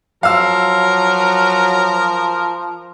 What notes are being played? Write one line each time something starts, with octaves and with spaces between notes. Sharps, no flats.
F3 F#3 A#4 F5 E6